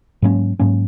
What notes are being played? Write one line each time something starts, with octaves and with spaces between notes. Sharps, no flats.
G#2 F#3 A#3 C#4
G#2 F#3 A#3 C#4